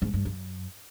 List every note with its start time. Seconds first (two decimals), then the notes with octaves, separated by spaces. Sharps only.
0.02 G#2
0.14 G2
0.25 F#2